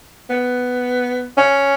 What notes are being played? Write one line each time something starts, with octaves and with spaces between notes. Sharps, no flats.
B3
C#4